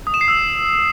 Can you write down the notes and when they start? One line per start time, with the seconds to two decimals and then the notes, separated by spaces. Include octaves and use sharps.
0.07 D#6
0.14 E7
0.21 C7
0.28 E6